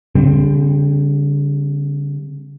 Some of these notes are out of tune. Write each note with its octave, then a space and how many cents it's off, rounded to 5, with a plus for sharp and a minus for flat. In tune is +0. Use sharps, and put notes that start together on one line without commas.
D3 -40 G3 +25 C4 +0